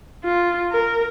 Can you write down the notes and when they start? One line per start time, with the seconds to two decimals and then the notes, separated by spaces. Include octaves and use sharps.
0.24 F4
0.72 A#4